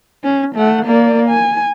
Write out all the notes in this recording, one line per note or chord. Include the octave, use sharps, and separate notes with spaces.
C#4
A3 F#5
A#3 D5
G#5